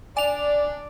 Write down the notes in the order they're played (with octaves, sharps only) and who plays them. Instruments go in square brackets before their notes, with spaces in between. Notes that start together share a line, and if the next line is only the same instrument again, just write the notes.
[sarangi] D4 [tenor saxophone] D5 [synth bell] G#5 F7